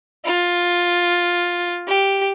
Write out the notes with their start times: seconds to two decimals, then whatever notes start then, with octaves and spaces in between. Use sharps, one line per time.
0.25 F4
1.87 G4